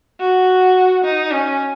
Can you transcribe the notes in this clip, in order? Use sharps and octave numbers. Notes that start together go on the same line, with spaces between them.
F#4
D#4
C#4